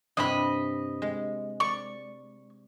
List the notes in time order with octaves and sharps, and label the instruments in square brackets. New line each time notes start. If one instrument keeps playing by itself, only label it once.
[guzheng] G2 C3 E4 [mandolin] D#5 B5
[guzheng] G#3
[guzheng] D5 [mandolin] C#6